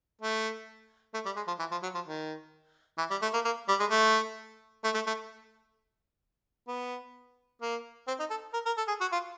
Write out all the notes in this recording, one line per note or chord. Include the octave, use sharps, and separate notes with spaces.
A3
A3
G3
G#3
F3
E3
F3
F#3
F3
D#3
E3
G3
A3
A#3
A#3
G3
G#3
A3
A3
A3
A3
B3
A#3
C4
D#4
A4
A#4
A#4
A4
G#4
F#4
F4